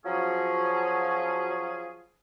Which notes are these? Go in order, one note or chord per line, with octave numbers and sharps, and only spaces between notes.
F3 F#3 C#4 G#4